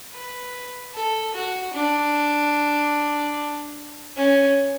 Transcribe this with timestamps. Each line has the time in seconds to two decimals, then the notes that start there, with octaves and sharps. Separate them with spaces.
0.13 B4
0.95 A4
1.34 F#4
1.74 D4
4.16 C#4